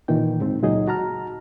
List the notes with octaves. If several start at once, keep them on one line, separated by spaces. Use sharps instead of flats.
A#2 D#3 E3 G5
D2 G#2 C4
C#2 A#2 F#3 D#4 G#4 D#5
F#4 A5 A#5 F6